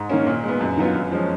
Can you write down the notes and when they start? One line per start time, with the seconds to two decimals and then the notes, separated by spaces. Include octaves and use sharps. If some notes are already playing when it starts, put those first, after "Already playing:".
Already playing: G#2
0.09 D#3 A#3 C#4
0.27 A#2
0.44 G#3 B3
0.61 F#2
0.77 D#3 F#3 B3 F4
0.95 F#2
1.11 F3 G#3 C#4